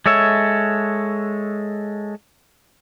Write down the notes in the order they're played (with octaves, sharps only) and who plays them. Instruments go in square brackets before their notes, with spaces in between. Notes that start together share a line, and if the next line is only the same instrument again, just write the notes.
[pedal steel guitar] G#3 A4 C#5 E5